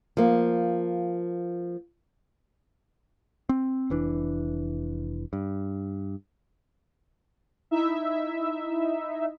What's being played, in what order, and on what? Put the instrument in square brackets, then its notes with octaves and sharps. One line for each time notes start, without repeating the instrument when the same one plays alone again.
[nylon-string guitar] F3 A#3
[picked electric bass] C4
F1 E3 D4
G2
[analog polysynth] D#4 E4 E5